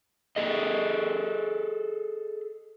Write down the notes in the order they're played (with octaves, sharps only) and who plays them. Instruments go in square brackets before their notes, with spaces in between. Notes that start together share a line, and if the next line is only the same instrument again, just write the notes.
[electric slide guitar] G#4 A4 D#5